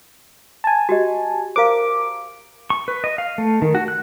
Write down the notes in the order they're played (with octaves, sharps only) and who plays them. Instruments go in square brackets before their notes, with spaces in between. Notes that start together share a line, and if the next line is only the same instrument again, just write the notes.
[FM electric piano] G#5 A5
[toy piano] F#4 G4 D#5
[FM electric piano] A#4 D6 [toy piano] C5 F5
[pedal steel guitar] C#6
B4
D#5
F5
A3
D#3
F#4
F#6